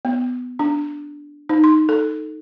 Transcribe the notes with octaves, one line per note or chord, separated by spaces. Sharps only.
B3
D4
D#4
C6
A4